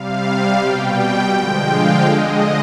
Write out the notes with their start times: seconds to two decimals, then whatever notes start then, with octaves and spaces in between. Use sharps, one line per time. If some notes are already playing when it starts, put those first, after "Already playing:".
Already playing: C3 G3 F5
0.24 F5
0.59 B2 G3 G5
1.31 D3 F3 G#3 G5
1.67 F5
2.02 D3 G#3 D#5